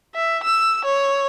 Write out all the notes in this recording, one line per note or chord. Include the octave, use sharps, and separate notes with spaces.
E5
E6
C#5